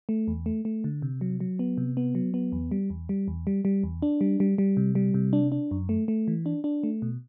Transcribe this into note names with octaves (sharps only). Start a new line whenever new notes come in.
A3
E2
A3
A3
D3
C3
F#3
F#3
B3
C3
B3
F#3
B3
E2
G3
E2
G3
E2
G3
G3
E2
D4
G3
G3
G3
C3
G3
C3
D4
D4
F#2
A3
A3
E3
D4
D4
A3
B2